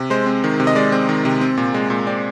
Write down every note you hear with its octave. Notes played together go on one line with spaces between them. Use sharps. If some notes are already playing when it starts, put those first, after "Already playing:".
Already playing: C3
G#3 C5
C4
D#3
C3
D#5
G#3 D5
C4
D#3
C3
C4
A#2
G#3
A#2
C4 D5